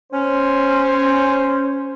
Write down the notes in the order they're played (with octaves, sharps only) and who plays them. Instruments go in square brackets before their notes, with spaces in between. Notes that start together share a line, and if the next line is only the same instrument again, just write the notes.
[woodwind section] C#4 [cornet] C5